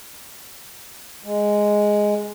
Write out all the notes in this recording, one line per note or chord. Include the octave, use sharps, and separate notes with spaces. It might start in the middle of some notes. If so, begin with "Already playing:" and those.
G#3